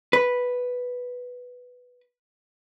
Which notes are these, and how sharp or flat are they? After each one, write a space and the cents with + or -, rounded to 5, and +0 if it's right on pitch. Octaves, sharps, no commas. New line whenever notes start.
B4 +0